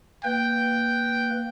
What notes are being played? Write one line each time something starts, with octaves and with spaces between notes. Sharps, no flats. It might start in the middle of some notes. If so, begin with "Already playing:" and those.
A#3 B4 G5